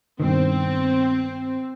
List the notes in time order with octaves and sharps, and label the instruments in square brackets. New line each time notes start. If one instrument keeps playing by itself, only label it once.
[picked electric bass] G2 B2 D#3 [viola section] C4